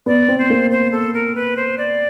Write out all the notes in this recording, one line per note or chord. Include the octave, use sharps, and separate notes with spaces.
B3 D5
C4
C5
A#3
C5
A4
A#4
B4
C5
D5